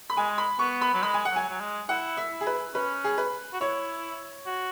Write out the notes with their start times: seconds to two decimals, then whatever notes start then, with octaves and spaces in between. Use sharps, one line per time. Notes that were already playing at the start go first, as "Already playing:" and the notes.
0.10 B5
0.16 G#3 G#5
0.38 B5
0.59 B3 C#6
0.81 B5
0.93 F#3
1.03 G#3 B5
1.14 G#5
1.25 F#5
1.31 F#3 G#5
1.49 F#3
1.60 G#3
1.89 E4 F#5
2.17 E5
2.32 E4
2.41 G#4
2.47 B4
2.74 C#4 B4
3.04 G#4
3.18 B4
3.53 F#4
3.60 E4 C#5
4.46 F#4